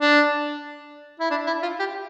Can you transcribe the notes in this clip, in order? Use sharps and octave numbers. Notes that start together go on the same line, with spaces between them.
D4
E4
D4
E4
F4
G4